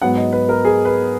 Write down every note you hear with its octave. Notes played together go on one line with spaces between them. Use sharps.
G#2 F#3 B3 F#5
D#5
B4
A#4
G#4
B4